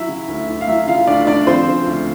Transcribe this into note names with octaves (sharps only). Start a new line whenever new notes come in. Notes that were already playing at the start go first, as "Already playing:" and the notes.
Already playing: F#3 E4 E5
C#3
D2
D2
F5
F#3 E4 E5
C#3 F4 F5
D2 D4 D5
D2 D4 D5
F3 C4 C5
C#3
D2